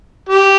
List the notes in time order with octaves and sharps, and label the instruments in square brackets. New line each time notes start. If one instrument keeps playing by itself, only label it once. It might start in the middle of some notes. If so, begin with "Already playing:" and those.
[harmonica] G4